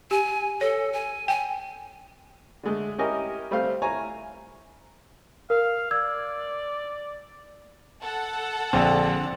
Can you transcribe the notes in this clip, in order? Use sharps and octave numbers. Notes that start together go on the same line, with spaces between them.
G4 G#5
A4 C#5
G#5
G5 G#5
D3 G#3 A3
C#4 E4 G4 A#4 D#5 G#5
G3 A3 C4 F5
E4 C#5 G#5 A#5
A#4 F5
D5 E6 G#6
A4 F#5
A#1 D3 C4 D4